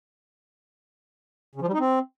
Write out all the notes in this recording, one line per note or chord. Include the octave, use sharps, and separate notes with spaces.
C#3
F3
G3
D#4
C4